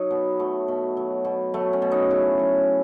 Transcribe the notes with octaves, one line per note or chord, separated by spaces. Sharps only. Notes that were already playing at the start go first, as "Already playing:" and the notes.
Already playing: F#3 D#4
B2 B3
F#3 A3
B2
F#3
B2
F#3 A3
C#4
B2
D#4
C#3 E4
F#3